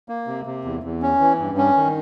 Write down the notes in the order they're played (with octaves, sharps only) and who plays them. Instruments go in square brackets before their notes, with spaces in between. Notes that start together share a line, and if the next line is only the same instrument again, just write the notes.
[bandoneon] A#3
C3
C3
E2
E2
C#4
E3
G2
C#4
D#3